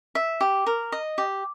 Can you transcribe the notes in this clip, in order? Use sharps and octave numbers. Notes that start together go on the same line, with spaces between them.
E5
G4
A#4
D#5
G4